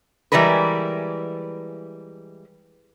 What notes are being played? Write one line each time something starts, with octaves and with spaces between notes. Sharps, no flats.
E3 G3 G#3 A#4 B4